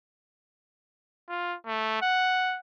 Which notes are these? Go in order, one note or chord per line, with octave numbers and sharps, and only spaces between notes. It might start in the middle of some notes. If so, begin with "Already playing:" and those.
F4
A3
F#5